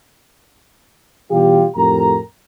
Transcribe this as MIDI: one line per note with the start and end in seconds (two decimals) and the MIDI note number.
1.31 1.65 47
1.31 1.65 52
1.31 1.65 55
1.31 1.65 65
1.31 1.65 67
1.75 2.18 41
1.75 2.18 45
1.75 2.18 67
1.75 2.18 70
1.75 2.18 82